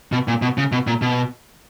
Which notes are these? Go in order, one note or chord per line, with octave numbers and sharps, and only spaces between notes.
B2
A#2
B2
C#3
B2
A#2
B2